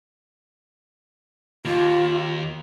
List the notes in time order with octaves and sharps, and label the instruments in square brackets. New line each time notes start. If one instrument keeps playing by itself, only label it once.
[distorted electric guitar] D#2 [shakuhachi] F4